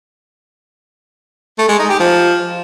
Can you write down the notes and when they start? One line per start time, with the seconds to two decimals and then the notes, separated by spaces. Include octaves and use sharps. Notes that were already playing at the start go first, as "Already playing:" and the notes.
1.59 A3
1.69 G#3
1.79 D#4
1.89 G4
2.00 F3